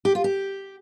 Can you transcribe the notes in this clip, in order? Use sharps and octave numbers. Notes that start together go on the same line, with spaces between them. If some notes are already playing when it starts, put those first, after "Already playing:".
G4
F4
G4